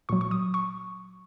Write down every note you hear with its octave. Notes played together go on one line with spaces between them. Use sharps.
A#2 F#3 C#6
C#6
D#6
C#6